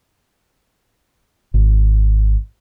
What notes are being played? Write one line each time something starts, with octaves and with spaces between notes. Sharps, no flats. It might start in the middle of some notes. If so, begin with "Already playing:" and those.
G#1